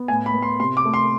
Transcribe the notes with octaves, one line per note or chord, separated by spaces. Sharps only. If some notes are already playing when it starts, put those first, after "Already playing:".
Already playing: B3
A2 G#5
B5
B3
C6
C3 C6
D6
A3
C6